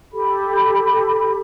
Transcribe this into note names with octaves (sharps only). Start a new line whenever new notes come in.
G4 A4 B5